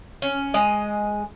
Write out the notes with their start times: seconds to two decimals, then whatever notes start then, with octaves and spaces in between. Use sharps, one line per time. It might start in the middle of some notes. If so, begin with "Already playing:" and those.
0.22 C#4
0.54 G#3 D#5